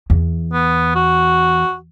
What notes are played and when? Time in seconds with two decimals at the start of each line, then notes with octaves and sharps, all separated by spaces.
0.10 E2
0.53 B3
0.95 F#4